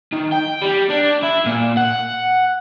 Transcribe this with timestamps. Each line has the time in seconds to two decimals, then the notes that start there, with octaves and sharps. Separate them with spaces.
0.13 D#3
0.32 G5
0.62 G3
0.90 D4
1.23 E4
1.46 A#2
1.77 F#5